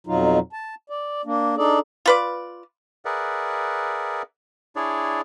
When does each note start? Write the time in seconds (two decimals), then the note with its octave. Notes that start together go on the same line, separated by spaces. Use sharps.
0.07 F2 B2 F#3 D#4 F4
0.53 A5
0.90 D5
1.25 A#3 D4
1.57 D4 D#4 G#4 A4 D5
2.06 F4 B4 D5
3.05 G#4 A#4 B4 D5 E5 F#5
4.76 D4 E4 G#4 C#5 D5